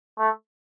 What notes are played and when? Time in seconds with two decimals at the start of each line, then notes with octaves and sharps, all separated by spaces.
0.19 A3